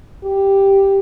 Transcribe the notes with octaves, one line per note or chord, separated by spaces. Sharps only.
G4